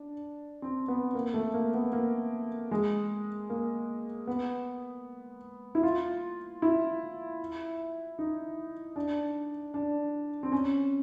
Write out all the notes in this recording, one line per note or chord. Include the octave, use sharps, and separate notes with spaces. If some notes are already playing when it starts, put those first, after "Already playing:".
Already playing: D4
C4
B3
A#3
A3
A#3
B3
A#3
G#3
A#3
B3
E4
F4
E4
D#4
D4
D4
C4
C#4